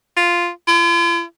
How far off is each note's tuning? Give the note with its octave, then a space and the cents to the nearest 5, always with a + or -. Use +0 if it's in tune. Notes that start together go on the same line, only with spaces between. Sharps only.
F4 -5
F4 -45